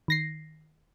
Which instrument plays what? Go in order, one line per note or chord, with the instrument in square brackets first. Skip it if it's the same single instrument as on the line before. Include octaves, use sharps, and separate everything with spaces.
[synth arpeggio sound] D#3 A#6 C7